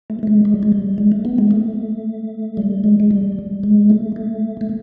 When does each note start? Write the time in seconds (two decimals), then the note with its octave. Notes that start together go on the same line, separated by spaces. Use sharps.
0.10 A3
0.23 A3
0.27 G#3
0.45 G#3
0.54 G3
0.63 G#3
0.72 G3
0.98 G#3
1.12 A3
1.25 B3
1.38 G#3
1.51 A3
2.57 G3
2.84 G#3
3.00 G#3
3.11 G3
3.64 G#3
3.90 A3
4.16 A3
4.61 A3